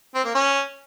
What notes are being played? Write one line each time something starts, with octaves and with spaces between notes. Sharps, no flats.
C4
A#3
C#4